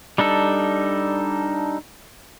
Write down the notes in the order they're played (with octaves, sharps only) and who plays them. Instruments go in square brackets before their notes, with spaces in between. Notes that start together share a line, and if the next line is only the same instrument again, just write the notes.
[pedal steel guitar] G3 D4 D#4 A4